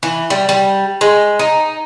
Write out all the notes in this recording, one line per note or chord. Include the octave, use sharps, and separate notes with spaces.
E3
G3
G3
G#3
D#4